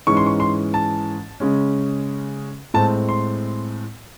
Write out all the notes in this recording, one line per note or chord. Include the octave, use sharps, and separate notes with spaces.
G#2 E3 G#3 C#4 C#6
C6
C#6
C6
A5
C#3 G#3 C#4
A2 G#3 C4 A5
C6